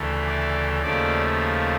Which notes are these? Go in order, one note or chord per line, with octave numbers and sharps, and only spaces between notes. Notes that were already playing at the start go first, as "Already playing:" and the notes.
Already playing: D2 C#3 E3 A3
D5
D#2 C#3 F3 A3 D5